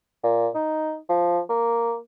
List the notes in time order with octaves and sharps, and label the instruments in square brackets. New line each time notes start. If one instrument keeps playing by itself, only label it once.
[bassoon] A#2
D#4
F3
A#3